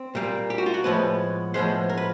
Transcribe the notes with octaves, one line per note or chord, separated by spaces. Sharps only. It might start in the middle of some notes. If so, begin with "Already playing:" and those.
Already playing: C4
A#2 G3 A#3
G4
F#4
F4
F#4
A2 F3 G#3 B3 B4
A2 F3 G#3 B3 C5
A#4
B4